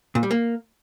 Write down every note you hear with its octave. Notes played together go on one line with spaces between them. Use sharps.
A#2
G3
A#3